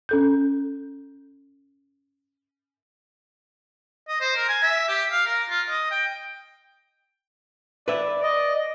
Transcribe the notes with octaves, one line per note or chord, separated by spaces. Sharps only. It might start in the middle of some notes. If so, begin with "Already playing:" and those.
C#4 A4 G6
D#5
C5
A#4
G#5
E5
G4
F5
A#4
F4
D#5
G5
B4 D5 E5
D5 D#5